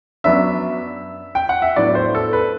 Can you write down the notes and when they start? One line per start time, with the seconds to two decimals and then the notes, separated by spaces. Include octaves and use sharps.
0.24 F#2 F#3 B3 D4 E5
1.35 G5
1.49 F#5
1.62 E5
1.76 A2 F#3 B3 D4 D5
1.95 C5
2.15 A4
2.33 B4